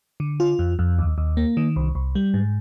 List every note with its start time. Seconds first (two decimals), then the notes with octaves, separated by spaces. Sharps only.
0.20 D3
0.40 F4
0.59 F2
0.79 F2
0.98 D#2
1.18 D#2
1.37 A#3
1.57 D#3
1.76 C2
1.95 C2
2.15 G3
2.34 G#2